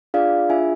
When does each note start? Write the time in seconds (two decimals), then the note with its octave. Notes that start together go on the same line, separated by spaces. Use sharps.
0.14 D4 F4 G#4 D5 F5
0.50 D4 F4 G#4 E5 G#5